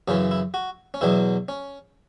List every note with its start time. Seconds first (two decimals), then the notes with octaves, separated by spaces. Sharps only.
0.08 F#2 C#3 E3 C#4
0.31 E4
0.54 F#4
0.94 C#4
1.01 E2 B2 F#3 E4
1.48 C#4